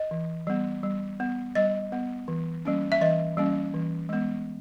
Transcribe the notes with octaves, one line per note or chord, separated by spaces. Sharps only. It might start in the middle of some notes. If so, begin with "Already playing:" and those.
Already playing: D#5
E3
G3 B3
G3
B3
G3 D#5
B3
E3
G3 A#3 C#4
E5
E3 D#5
G3 A#3 C#4
E3
G#3 B3